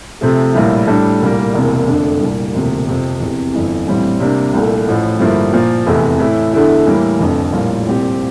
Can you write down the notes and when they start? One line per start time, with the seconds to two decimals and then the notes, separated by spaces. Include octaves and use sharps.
0.21 C3 F3 A3
0.54 A#1 A2 G3 A#3 E4
0.87 A2 G3 D4 A4
1.21 C2 A#2 G3 A#3
1.54 E1 E2 C3 E3 A#3
1.87 F2 D3 A3 D4
2.20 C2 A#2 G3 A#3
2.54 E1 D2 C3 F3 A#3
2.87 F2 C3 F3
3.20 F1 E2 C3
3.53 G1 F2 E3
3.87 A#1 A2 E3 G3 C4
4.20 C3 G3 A#3 D4
4.53 C2 A#2 A3
4.87 A1 A2 F3
5.20 G2 D3 F3 A#3 E4
5.53 A#2 F3 A#3
5.86 F1 E2 C3 E3 A3
6.19 A2 E3 A3 E4
6.53 E2 D3 A3 E4
6.86 A2 E3 G3 A#3 E4
7.20 F1 F2 D3
7.53 A#1 A2 G3 A#3 F4
7.86 C2 A#2 F3 C4 G4